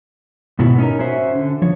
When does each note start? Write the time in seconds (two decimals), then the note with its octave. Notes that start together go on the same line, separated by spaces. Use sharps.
0.59 G#2 B2 B3 E4 F#4
0.78 C#4 D#4 A4 A#4
0.99 C#4 F#4 C5 E5
1.35 D3
1.62 F3 C#5